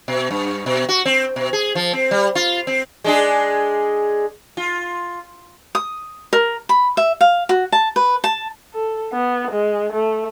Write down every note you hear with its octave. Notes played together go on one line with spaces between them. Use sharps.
B2
G2
B2
F#4
C4
B2
G#4
F3
C4
G3
F4
C4
G#3 D4 G#4
F4
D#6
A#4
B5
E5
F5
F#4
A5
B4
A5
A4
B3
G#3
A3